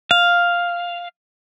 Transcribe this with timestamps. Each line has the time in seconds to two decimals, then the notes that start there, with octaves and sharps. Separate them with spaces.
0.11 F5